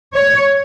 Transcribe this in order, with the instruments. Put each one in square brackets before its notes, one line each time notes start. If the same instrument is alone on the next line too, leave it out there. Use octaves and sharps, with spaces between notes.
[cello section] C#5